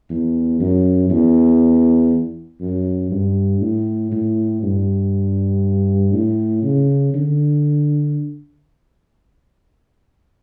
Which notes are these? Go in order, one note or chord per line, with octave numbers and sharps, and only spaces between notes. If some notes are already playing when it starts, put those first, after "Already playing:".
E2
F#2
E2
F#2
G2
A2
A2
G2
A2
C#3
D3